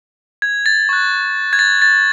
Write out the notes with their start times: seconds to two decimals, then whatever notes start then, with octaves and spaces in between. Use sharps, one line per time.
0.42 G#6
0.66 A6
0.89 C#6 F#6
1.53 G#6
1.59 A6
1.82 A6